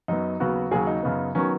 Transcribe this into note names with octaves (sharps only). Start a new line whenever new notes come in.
F#2 F#3 B3 D#4
D#2 C#3 F#3 B3 F#4
D#2 C#3 F#3 G#4
D#4
F#2 C#3 B3
D#3 F#3 B3 C#4